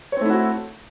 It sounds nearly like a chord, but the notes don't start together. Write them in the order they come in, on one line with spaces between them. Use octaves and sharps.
C#5 C4 A3 E4 F#4